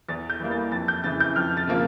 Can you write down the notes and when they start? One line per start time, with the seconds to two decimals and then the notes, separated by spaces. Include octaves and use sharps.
0.09 E2 A6
0.30 G6
0.40 E3 G3 A#3
0.51 A6
0.72 F2 A6
0.88 G6
1.04 C#3 E3 A6
1.20 G6
1.36 F2 F6
1.57 A6
1.67 C#3 F3 A#3